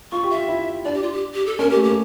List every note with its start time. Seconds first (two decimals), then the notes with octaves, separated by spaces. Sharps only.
0.12 F4 C#6
0.23 G4
0.30 F4 E5
0.48 E4
0.85 D4 D5
0.94 G4
1.03 F4
1.12 G4
1.34 G4
1.46 A4
1.59 C#4 A#4
1.67 A#3
1.71 G4
1.76 A3
1.83 A#3 G4